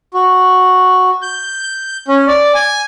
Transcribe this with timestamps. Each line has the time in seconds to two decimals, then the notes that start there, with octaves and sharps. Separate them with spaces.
0.14 F#4
1.22 G6
2.08 C#4
2.27 D5
2.55 G#5